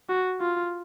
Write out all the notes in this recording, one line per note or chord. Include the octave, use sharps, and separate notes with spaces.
F#4
F4